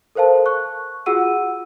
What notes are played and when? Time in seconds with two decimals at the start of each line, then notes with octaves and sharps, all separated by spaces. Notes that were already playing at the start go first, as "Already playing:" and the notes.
0.15 A4 A#4 C5 F5 A5
0.46 C#6 F#6
1.06 F4 F#4 G#4 F#5 E6 D#7